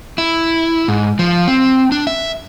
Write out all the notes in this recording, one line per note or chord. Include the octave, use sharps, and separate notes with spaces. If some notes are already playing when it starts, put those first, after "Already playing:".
E4
G#2
F3
C4
D4
E5